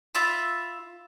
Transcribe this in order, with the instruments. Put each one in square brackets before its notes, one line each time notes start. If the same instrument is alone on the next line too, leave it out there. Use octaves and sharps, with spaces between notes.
[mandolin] F4 E5 B5